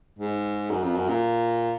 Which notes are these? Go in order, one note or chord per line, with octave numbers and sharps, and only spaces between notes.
G#2
F#2
F2
F#2
A#2